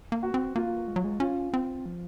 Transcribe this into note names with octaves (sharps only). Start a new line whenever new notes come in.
A#3
F#4
C4
A#3 F4
G#3
F#3
G#3
C#4 F4
C4
F3